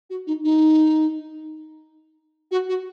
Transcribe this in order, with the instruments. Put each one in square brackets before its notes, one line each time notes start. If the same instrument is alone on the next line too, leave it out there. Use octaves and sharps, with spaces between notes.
[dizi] F#4
D#4
D#4
F#4
F#4